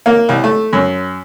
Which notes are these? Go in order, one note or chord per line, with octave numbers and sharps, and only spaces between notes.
A#3
C2
A3
F#2